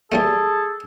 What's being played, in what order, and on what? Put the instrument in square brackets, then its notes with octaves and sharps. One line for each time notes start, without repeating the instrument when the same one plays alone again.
[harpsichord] E3 G3 A3 [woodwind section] G#4 A4